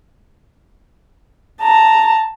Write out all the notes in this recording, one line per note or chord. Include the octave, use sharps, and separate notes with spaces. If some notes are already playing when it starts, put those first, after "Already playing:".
A5 A#5